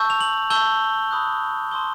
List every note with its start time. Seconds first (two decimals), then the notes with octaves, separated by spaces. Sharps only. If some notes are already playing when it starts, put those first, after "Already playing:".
Already playing: A5 C#6 E6 G6
0.10 F7
0.21 F#7
0.50 A5 C#6 E6 G6 G7
1.11 B5 D#6 F#6
1.71 A5 C6 D#6 G6 G7